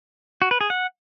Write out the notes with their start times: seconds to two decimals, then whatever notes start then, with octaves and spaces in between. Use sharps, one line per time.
0.42 F#4
0.51 B4
0.61 G#4
0.70 F#5